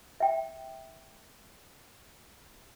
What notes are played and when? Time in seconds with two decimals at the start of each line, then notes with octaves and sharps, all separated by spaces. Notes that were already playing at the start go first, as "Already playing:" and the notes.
0.20 E5 G5